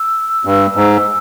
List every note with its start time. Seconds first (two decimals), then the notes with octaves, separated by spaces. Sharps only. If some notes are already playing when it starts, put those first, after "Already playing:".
Already playing: E6
0.45 G2
0.76 G#2